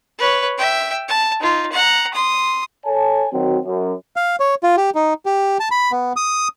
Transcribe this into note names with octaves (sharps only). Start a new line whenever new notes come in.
B4 C#5
E5 G5
A5
D#4 F4
F#5 A#5
C6 D#6
A4 C#5 G#5 A5
D#3 F#3 C4 F#4
F#2
F5
C#5
F4
G4
D#4
G4
A5
B5
B3
D#6